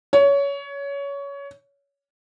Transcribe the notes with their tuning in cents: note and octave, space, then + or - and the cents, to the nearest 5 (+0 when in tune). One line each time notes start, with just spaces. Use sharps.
C#5 +20